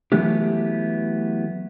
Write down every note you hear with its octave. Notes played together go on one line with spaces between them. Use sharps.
E3 F#3 A3 B3 E4 G4